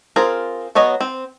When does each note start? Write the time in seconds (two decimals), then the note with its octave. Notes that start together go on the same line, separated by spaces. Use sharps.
0.16 C4 F4 G#4 A#4
0.75 F#3 B3 C#5 D#5
1.00 C4